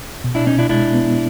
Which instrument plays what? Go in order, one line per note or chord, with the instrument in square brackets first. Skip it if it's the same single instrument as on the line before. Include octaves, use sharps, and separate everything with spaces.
[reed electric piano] B2
[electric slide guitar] D4 E4
[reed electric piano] B2 [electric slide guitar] C#4 D#4
[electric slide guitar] D4 E4
[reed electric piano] G#3 [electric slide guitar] D4 E4
[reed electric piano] B3